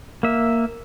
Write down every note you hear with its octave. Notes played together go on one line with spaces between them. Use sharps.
A#3 E5